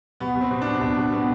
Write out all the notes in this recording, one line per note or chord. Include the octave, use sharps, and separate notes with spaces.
B2 B3
B2
C4
B2
B2 D4
B2 D4
B2
B2 B3